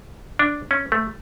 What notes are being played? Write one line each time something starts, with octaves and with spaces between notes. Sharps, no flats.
D4
C#4
A3